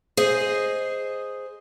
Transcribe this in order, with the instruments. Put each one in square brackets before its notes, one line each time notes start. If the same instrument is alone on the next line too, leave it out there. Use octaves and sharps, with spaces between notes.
[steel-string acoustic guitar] G#4 C5 D#5